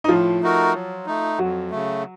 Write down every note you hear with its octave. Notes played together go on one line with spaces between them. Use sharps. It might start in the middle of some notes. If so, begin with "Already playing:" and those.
D#4
A2 F3 F4
A3 D#4 F#4 A#4
F#3
A3 D#4
F2 F#3 F#4
C#3 A3